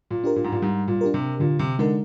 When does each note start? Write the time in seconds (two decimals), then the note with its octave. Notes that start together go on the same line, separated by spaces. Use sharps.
0.11 A#2
0.24 D4 G4 A#4
0.36 A#2
0.44 G#2
0.52 A#2
0.62 G#2 G3
0.88 A#2
1.01 D4 G4 A#4
1.14 C3
1.40 A#2 D3
1.59 C3
1.79 D3 G#3 D#4 A#4